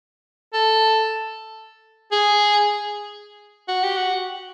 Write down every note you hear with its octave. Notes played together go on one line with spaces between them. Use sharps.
A4
G#4
F#4
G4
F#4